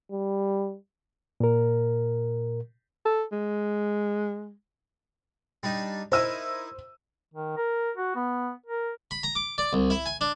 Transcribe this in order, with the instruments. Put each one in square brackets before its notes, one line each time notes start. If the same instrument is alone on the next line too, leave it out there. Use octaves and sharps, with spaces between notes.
[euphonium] G3
[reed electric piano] A#2 A#4
[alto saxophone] A4
G#3
[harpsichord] G3 D4 D#4
[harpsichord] D#4 E4 A#4 [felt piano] C5 E6 D#7
[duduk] D#3
A#4
F#4
B3
A#4
[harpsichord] B5
A#5
D6
D5
C2
E4
G#5
D4